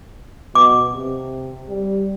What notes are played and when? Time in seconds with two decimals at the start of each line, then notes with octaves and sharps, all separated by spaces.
0.55 B2 D6
0.94 C3
1.69 G3